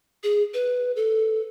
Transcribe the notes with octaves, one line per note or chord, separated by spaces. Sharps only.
G#4
B4
A4